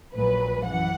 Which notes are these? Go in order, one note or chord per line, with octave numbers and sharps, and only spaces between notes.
A#1 A#2 F#3 B4
F#2 E3 F#5